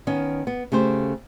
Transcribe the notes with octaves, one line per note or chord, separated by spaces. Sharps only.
D#3 B3 C#4
B3
C#3 A3 G4 C5